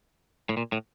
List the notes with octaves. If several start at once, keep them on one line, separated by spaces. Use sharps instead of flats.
A2
A#2
A2